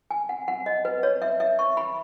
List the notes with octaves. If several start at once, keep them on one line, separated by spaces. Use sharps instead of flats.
G#5
F#5
F#5
D#5
B4
C#5
E5
E5
C#6
B5